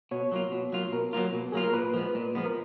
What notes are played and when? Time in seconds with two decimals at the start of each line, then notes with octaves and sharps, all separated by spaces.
0.11 B2 C#5
0.32 F#3 A#3 F4
0.52 B2
0.72 F#3 A#3 F4
0.92 B2 A#4
1.13 F#3 A#3 F4
1.33 B2
1.52 F#3 A#3 F4 G#4
1.64 A#4
1.74 A#2 B4
1.94 F3 G#3 B3
2.15 A#2
2.35 F3 G#3 B3
2.46 A#4